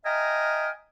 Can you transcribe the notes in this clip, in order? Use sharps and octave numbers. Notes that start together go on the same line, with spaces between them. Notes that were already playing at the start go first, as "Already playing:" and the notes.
D#5 E5 G5 G#5 A#5 F6